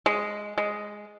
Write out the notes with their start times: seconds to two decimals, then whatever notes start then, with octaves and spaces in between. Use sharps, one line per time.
0.06 G#3
0.58 G#3